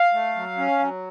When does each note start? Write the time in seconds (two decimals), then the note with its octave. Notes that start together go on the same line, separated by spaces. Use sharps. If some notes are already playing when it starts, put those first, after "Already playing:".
Already playing: F5
0.13 A3
0.36 F#3
0.58 C#4
0.79 F#3